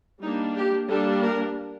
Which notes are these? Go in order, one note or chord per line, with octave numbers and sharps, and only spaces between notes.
G3 A#3 D4 D#4
G4
G3 A#3 D4 A4
A#4